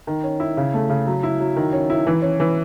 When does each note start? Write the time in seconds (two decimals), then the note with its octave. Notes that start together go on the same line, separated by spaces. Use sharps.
0.07 D#3
0.24 C#4
0.40 E4
0.57 C#3
0.74 A3
0.90 C#3
1.07 F#3
1.23 E4
1.40 F#3
1.56 D#3
1.73 C#4
1.90 E4
2.07 E3
2.22 C#4
2.40 E3